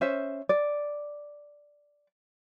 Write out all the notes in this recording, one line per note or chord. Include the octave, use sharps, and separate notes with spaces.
C#4 C5 E5
D5